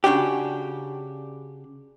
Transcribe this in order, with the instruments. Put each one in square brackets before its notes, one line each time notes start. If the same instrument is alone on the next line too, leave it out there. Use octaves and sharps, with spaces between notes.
[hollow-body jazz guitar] C#3 D4 F#4 G4